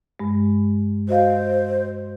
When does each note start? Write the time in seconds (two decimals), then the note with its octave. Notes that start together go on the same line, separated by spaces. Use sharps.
0.19 G2 G#3
1.09 F#4 C5 D#5 F5